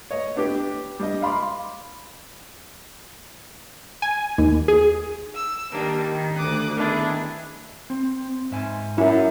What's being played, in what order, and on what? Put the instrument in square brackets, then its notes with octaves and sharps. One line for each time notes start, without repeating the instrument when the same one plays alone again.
[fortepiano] C#5 D#5
B3 D4 G4
G3 D4 D#5
F5 B5 C6 D6
[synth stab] G#5
D#2
G#4
[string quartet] E6
D#3 G3 A#3 D4
D#3
D2 D6 D#6 F#6
D#3 B3 D4 E4 G#4
[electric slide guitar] C4
G#2 E5 G#5
[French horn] F#2 [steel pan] E4